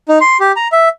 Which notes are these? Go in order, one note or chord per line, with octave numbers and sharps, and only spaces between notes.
D#4
C6
G4
A#5
E5